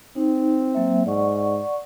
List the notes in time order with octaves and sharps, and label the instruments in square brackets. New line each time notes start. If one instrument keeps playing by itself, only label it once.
[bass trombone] C4 [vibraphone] D#4
[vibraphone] F#3 A#3 E5
[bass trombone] G#2 [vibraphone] D5 F#5 C#6